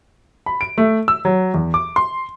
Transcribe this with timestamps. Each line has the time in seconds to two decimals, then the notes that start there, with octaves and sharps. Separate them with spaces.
0.46 B5
0.61 D7
0.78 A3
1.08 E6
1.25 F#3
1.54 E2
1.74 D6
1.96 C6